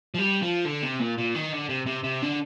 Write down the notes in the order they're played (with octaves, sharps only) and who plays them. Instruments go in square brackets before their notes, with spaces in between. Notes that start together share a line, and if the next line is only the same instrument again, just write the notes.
[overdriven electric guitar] F3
G3
F3
D3
C3
A#2
A#2
D#3
D3
C3
C3
C3
D3